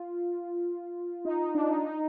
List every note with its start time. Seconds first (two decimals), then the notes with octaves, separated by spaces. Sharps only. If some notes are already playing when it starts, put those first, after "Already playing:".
Already playing: F4
1.25 D#4
1.40 D#4
1.55 D4
1.70 D#4
1.86 D#4